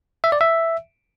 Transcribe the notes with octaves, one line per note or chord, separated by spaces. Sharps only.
E5
D5
E5